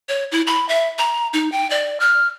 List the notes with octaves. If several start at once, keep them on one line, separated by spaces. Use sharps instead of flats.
C#5
E4
B5
E5
A#5
D#4
G5
D5
F6